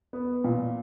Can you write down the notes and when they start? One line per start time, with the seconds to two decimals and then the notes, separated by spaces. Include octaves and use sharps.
0.13 B3
0.44 A#2